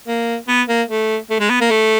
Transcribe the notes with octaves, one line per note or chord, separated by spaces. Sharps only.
A#3
B3
A#3
A3
A3
G#3
B3
A#3
A3